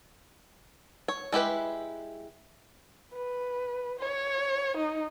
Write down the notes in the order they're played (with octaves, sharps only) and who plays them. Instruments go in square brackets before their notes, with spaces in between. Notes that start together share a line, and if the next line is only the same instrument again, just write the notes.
[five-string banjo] C#5
G#3 E4 G4 B4
[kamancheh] B4
C#5
D#4